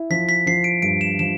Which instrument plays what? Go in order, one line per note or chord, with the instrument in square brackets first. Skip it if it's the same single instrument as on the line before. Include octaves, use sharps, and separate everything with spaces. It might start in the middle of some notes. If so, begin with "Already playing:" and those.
Already playing: [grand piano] E4
[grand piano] F3 [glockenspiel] B6
[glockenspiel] B6
[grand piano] F3 [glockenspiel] C7
[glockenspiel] D7
[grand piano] G2 [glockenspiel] D7
[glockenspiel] E7
[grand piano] F3 [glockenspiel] E7